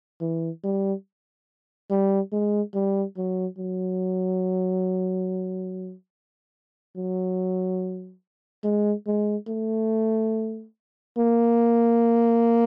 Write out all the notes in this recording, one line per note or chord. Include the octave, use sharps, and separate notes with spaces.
E3
G3
G3
G#3
G3
F#3
F#3
F#3
G#3
G#3
A3
A#3